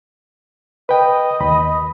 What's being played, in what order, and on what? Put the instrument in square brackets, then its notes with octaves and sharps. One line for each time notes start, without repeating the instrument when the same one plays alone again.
[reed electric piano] B4 G5 [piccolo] D#5
[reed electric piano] D#2 B5